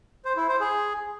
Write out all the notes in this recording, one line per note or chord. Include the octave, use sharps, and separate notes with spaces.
C5
E4
C5
G#4